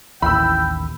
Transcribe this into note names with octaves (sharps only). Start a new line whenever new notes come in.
A1 D#2 E4 G5 B5 E6